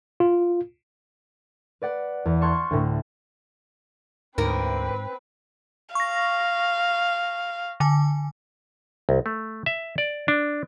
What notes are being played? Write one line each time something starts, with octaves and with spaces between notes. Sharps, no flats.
F4
B4 D5 F#5
E2
A5 C6 C#6 F6 F#6 G#6
D2 A2
D2 G#2 D3 C4 A#4 B4
F5 C#6 A#6
D3 G#5
C2
A3
E5
D5
D4